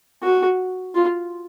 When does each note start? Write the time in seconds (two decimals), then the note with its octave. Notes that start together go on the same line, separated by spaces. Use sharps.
0.23 F#4
0.95 F4